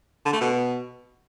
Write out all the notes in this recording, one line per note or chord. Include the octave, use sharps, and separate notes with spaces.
D3
A3
B2